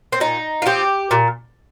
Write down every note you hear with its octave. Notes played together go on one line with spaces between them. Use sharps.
C4
A#2 D#4
F4
F3 C4 G4
A#2